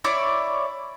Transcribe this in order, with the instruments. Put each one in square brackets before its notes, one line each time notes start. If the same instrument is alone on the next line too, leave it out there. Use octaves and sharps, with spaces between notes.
[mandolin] E4 C#5 D5 D6